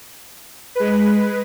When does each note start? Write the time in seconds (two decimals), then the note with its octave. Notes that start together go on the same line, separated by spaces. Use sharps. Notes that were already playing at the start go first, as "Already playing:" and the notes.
0.75 G#3 B4